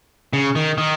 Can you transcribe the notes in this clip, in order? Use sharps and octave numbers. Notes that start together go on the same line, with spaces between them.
C#3
D#3
D#3